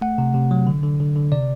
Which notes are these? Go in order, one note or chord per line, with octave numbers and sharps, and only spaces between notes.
A3 F#5
C3
C3
F#3
D3
D3
D3
D3
C3 D5